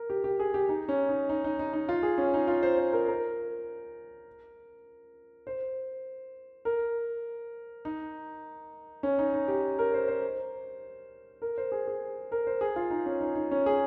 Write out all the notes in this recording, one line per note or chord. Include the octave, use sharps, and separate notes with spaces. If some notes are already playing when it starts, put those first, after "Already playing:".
Already playing: A#4
G4
G4
G#4
G4
D#4
C#4
D#4
D#4
D#4
D#4
D#4
F4
G#4
C#4
D#4
F4
C5
C5
A#4
A#4
C5
A#4
D#4
C#4
D#4
D#4
G4
A#4
C5
C5
A#4
C5
G#4
G#4
A#4
C5
G#4
F4
D#4
C#4
D#4
D#4
C#4
G#4